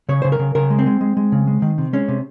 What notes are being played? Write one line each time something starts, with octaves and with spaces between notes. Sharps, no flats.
C#3 C#5
C#3 C5
A#4
C#3
C#3 A#4
G#3
C4
G#3
G#3
G#3
C#3
G#3
D#3
C3
G#3 C#4
C3